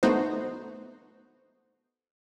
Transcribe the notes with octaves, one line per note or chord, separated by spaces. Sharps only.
A3 B3 D#4 F#4 C5